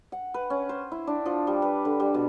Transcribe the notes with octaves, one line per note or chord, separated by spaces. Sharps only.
F#5
B4
C#4
C5
E4
D4
F3
G3
B4
D3
G3
B2